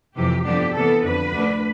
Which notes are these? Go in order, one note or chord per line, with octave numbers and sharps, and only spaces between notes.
F2 C3 E3 G4
G2 D3 F3 B3 D4 G4
C3 E3 B3 A4
F2 D3 F3 B4
D2 D3 A3 D4